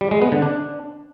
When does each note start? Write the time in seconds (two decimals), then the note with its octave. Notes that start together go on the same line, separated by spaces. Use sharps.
0.01 G3
0.11 G#3
0.22 B3
0.32 D3
0.42 D4